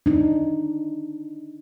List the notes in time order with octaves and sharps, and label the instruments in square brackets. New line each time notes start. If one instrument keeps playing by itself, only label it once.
[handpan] D4 D#4